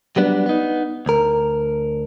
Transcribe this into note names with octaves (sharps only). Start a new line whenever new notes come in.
F#3 G3 B3 D4
B3 D#4
D2 A#4